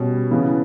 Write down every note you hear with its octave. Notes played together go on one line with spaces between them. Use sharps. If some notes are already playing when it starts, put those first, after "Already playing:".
Already playing: B2 G3 C#4
C#3 E3 B3